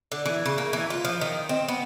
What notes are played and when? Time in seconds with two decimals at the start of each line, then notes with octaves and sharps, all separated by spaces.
0.12 D3
0.26 E3
0.46 C#3
0.58 A#3
0.73 E3
0.90 F4
1.05 F3
1.21 D#3
1.49 C4
1.68 B3